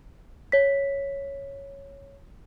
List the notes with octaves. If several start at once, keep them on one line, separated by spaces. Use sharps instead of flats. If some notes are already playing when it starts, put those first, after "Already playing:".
C#5 B6